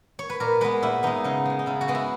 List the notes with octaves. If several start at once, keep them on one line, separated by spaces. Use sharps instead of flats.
C#5
B4
A#2 A#4
G#3 B3 B4
A#2 E4
G#3 B3 D#4
C#3 D#4
G#3 B3
D#4
C#3 E4
F#4
G#3 B3
E4